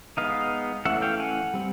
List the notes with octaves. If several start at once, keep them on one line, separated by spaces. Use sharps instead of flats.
G#3 B3 D#4 D#5 F5
E3 A3 C#4 E5 F#5
F5 G5
F#5 G#5
G3 C4